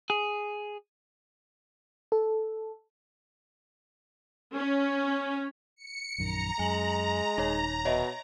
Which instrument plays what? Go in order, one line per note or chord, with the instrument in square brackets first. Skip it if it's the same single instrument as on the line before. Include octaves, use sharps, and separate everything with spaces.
[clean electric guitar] G#4
[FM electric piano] A4
[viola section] C#4
[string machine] C#7
[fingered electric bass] A#1 F#2 D#3 [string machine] A#5
[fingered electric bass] F#2 [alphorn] G#3 [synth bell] G#5 F#7
[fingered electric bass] D#1 [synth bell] D#4 C#5
[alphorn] B2 [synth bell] C#5 D#5 E5